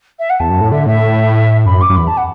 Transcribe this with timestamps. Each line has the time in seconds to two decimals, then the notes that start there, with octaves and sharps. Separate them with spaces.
0.19 E5
0.30 F#5
0.40 E2 A5
0.50 F#2
0.61 A2
0.72 D3 E5
0.87 A2 E5
1.66 F#2 B5
1.81 D6
1.90 F#2
1.96 E2 B5
2.07 A5
2.17 F#5